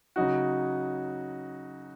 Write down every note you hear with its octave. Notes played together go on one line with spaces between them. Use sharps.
C#3 F#3 D#4 F#4